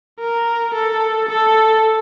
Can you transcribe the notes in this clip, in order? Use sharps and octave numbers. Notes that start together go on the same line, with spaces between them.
A#4
A4
A4